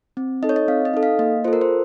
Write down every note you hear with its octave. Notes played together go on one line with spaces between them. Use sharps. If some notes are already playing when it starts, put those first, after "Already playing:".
C4
D#4 A4 D#5
C#5
D#5
C4 F5
D#5
D#4 A4
F5
A#3 D#5
F4 A4 C5
A#4
C5